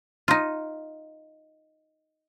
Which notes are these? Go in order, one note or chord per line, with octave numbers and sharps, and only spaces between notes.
D#4 F4